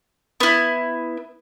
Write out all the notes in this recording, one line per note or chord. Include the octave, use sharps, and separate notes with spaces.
B3 E4